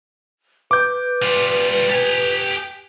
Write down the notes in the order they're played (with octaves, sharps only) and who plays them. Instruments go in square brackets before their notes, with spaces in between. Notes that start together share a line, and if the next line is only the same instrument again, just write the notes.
[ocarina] B4 [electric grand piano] D6 G6
[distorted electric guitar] G3 F4
G4 G#5